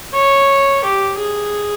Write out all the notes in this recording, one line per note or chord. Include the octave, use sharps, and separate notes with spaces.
C#5
G4
G#4